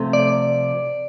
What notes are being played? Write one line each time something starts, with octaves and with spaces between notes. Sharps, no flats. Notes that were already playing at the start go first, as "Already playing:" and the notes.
Already playing: C3 F3 A3 C4
D5